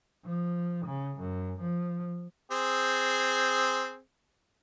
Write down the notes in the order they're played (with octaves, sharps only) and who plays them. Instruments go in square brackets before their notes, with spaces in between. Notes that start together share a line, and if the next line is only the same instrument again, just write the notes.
[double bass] F3
C#3
F#2
F3
[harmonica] C4 G#4